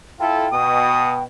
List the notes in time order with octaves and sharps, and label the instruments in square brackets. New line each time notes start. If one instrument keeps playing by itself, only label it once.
[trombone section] E4 F4 A4 [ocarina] G5
[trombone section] B2 [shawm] D#6